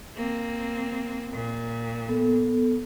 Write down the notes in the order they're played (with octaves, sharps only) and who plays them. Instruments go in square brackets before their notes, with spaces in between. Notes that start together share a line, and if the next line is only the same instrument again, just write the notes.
[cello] A#3 C4
A#2
[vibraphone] B3 A4